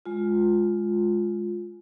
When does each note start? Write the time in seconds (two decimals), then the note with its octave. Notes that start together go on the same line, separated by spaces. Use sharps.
0.06 G#3 F4